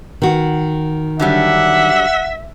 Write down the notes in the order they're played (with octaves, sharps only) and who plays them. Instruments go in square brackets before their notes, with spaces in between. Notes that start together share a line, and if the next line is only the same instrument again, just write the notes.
[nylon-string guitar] D#3 F#4
[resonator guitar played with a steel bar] D3 F#3 G3 [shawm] E5 [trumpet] F#5